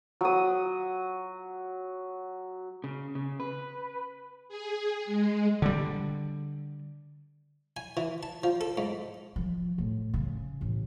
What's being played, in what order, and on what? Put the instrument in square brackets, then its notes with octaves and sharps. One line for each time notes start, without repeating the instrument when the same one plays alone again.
[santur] F#3 D#6
[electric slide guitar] C#3
C#3
B4
[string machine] G#4
G#3
[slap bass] D3 G3
[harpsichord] G#5
E3
A5
F3
A4
G#2
[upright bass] F3
A2
C#3
A1